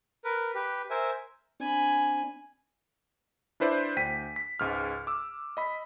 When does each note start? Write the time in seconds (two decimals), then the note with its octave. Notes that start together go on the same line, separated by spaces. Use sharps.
0.25 A#4 B4
0.55 G4 B4
0.90 A#4 C5 E5 G#5
1.60 C4 D4 G#5 B5
3.60 D4 E4 B4 C5 D5 E5
3.96 D2 G5 B6 D#7
4.36 B6
4.59 C#2 G#2 F6
5.07 D6 E6
5.57 D#5 B5 B6